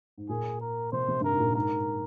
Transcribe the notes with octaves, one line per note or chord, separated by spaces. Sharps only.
G#2
A#2 G#4
A#4
C3 C5
C3
G2 A#4
G#2
A#2
G#2 A#4